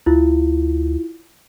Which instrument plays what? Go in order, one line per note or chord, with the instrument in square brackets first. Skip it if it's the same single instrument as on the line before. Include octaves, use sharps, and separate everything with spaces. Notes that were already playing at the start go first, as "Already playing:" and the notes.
[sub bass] D2 [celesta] E4 F4